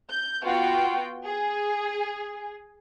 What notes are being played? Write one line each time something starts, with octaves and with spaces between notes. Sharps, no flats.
G6
B3 F4 F#4 G5
G#4